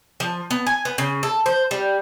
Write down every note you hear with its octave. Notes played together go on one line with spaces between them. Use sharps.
F3
B3
G#5
B3
C#3
A4
C5
G3